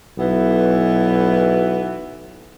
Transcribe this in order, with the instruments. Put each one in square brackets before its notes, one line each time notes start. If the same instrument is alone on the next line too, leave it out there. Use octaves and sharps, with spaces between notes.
[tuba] B1 [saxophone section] E3 B3 E4